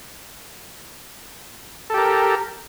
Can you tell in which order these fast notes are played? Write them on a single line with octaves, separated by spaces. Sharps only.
A4 G4 A#4